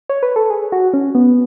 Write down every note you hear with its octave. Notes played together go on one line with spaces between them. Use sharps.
C#5
B4
A4
G#4
F#4
C#4
B3